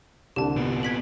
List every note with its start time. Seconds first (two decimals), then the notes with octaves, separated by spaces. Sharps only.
0.36 C2 D3 G4 A5
0.56 A#2 B3
0.83 G#6 B6 F#7